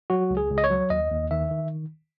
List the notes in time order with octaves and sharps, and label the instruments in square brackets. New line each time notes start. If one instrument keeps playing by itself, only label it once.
[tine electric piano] F#3 F#4
C#2
G#4
C#2
D#5
C#5
F#3
D#2 D#5
D#2
D#3 E5
D#3